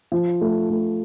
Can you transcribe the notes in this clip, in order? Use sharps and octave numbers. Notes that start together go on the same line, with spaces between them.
F3
A3
A3